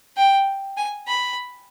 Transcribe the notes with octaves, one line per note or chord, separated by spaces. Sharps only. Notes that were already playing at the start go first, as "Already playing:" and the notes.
G5
G#5
B5